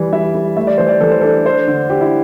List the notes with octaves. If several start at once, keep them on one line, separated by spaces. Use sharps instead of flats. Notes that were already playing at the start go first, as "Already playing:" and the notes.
Already playing: E3 G3 D5
G3 E5
G3
A3 E5
D5
E3 C5
D5
E3 A4
C5
D4 A4
D4 C5
D3
D4 G4
E4